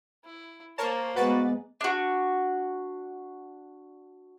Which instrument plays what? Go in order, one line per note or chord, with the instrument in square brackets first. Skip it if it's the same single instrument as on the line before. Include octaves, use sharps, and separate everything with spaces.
[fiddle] E4
[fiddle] A#3 C5 [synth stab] A#4 C#5 A5
[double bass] G#3 B3 [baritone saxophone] F#4 [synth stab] B4 D5 A6
[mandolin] D4 F#4